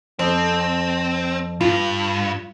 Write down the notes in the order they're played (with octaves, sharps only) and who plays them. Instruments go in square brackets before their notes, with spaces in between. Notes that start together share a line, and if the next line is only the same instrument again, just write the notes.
[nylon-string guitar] F2 [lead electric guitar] C4
[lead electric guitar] G2 [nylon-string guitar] F4